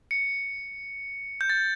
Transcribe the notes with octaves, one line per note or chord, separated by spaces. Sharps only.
C#7
G6
A6